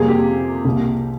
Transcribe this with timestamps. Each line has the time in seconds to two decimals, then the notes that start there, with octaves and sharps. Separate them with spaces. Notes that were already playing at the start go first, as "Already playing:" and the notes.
Already playing: F2 C3 G3 A#3 G#4
0.08 G4
0.65 C2 C3 G3 A#3